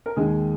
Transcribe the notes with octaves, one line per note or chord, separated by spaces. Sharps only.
A#4
D#2 D#3 G#3 A#3 G#4